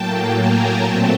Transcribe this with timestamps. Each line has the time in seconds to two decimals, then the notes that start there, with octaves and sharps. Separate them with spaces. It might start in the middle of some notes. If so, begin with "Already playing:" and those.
Already playing: A2 F#3 A#3 G5 A5
0.36 G#5 A#5
0.82 A#2 F#3 A3 C4 G5 A5